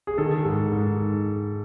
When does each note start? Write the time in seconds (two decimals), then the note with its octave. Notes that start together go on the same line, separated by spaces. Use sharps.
0.07 G#4
0.18 D#3 A4
0.45 G#2
0.72 G#2